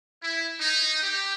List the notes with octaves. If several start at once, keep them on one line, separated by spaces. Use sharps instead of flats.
E4
D#4
G4